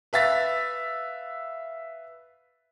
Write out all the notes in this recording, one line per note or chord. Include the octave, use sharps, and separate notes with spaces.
B4 E5 F5 A6 B6